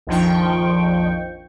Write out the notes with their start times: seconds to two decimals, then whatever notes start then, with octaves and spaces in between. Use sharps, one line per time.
0.07 A#1 F2 D#3 F3 G5 C#6